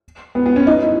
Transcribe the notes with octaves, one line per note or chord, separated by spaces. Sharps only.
B3
B3
C#4
D#4
E4